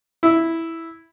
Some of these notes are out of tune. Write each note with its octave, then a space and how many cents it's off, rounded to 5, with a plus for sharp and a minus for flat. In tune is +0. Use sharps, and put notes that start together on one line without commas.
E4 -5